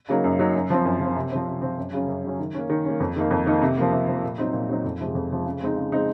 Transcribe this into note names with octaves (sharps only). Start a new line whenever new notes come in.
C#3 F#3 A#3 D#4
F#2
C#3 F#3 A#3 D#4
F#2
F3 C4
F#2
F3 C4
C3
F3 C4
C3
F3 C4
F#2
C#3 F#3 C#4
F#2
C#3 F#3 C#4
D#3
A#3 C#4
D#3
A#3 C#4
F2
D#3 A#3 D#4
F2
D#3 A#3 D#4
C3
F3 A#3
C3
F3 A#3
A#2
F#3 C4 D#4
A#2
F#3 C4 D#4
F2
C3 F3 G#3
F2
C3 F3 G#3
C#3
G#3 C4 D#4
C#3
G#3 C4 D#4